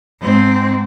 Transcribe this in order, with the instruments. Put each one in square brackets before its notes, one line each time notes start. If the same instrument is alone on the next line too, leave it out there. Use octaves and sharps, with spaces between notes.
[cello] G#2 C4